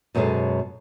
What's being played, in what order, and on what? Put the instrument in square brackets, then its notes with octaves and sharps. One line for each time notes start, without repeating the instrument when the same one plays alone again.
[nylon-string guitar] F#2 B2 F#3 G#3 A4 C5